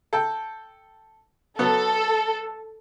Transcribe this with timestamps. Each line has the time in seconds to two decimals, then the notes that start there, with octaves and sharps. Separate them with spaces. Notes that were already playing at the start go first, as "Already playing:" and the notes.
0.13 A4 G5
1.59 F#3 B3 A4